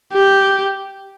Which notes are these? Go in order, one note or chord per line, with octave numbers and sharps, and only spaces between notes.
G4